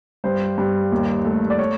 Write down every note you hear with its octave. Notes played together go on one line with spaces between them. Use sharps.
G2 C5
G2
D#2
A3
D5
C#5